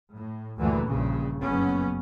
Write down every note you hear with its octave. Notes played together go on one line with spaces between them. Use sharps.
A2
D2 G2 A#2 D3 E3
A#1 G2 C#3
F#1 F#3 B3 C#4